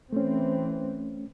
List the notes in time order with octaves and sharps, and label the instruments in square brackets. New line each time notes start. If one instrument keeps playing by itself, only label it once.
[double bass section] E3 C4 [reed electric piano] A3 C#4